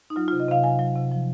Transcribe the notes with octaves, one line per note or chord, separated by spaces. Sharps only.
D#4
F#3 F4
F4
C3
D#5
C3 F5
F#3 G#5
F#3
C3
F3